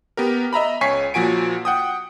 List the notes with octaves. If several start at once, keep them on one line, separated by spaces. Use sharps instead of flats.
B3 G4 A#4
D#5 E5 A#5 B5
C#2 C#5 G#5 C#6 B6 C7
A#2 F3 F#4 G#5 D7
F#5 G5 D#6